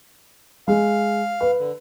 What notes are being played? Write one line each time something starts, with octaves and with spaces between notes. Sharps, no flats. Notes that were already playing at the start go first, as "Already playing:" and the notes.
G#3 F5
B4
D3